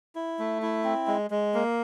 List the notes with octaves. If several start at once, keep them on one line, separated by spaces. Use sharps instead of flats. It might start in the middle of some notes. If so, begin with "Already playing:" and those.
E4
A3
E4
C4
G#3
G#3
A#3